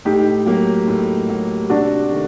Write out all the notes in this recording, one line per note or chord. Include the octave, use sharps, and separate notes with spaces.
A2 D#4 G4
F#3 A#3
A2
F#3 A#3
C3 D4 F#4
D#3 A3